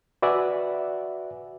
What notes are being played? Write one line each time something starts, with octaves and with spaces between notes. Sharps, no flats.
F#4 B4 D5 E5 F#5 G#5